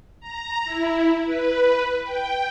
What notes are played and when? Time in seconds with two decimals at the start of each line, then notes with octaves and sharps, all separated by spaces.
0.20 A#5
0.65 E4
1.25 B4
2.04 G5